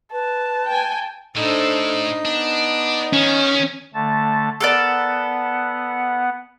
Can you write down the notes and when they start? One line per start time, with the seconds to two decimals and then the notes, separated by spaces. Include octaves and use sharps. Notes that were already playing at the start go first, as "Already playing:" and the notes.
0.12 B4 A5
0.68 G5 G#5
1.37 A2 D4 D#4 A4 C5
2.25 B3 D4
3.13 D#3 C#4
3.94 D3 A3 A5
4.61 B3 A4 A#4 D5 F#5